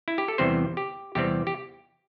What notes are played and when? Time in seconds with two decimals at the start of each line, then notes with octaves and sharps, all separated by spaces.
0.08 E4
0.18 G4
0.28 A4
0.38 E2 C3 E3 G3 C4 C5
0.77 G4
1.15 E2 C3 E3 G3 C4 G4
1.47 G4